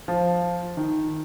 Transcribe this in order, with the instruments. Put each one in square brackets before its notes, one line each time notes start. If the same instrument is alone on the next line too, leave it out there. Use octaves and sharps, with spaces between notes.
[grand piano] F3
D#3